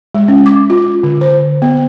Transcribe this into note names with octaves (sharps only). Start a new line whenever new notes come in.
G#3
C#4
D6
F4
D3
C5
B3